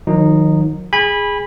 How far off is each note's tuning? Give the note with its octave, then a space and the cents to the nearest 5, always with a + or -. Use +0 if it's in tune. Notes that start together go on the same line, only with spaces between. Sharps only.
D#3 +0 F#3 -40 D#4 -10
G#4 -10 G#5 -30 B5 -10